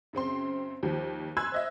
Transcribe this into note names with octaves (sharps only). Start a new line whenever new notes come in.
F#2 C#3 C4 C6
D#2 F3 G3
G#5 B5 C6 E6 F#6 G#6
C5 D#5 E5